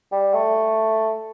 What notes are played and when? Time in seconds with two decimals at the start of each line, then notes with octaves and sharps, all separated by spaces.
0.12 G3
0.34 A3